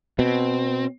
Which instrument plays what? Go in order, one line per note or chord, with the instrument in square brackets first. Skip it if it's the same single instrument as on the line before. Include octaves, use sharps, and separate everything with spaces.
[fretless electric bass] B2 [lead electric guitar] C4